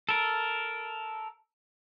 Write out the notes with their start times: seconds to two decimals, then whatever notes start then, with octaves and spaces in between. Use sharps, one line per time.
0.09 A4 A#4